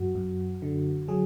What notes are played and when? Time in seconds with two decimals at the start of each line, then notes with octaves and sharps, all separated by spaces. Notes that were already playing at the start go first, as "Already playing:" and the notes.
Already playing: F#2 F#4
0.15 F#2
0.62 D3
1.08 F#3 G#4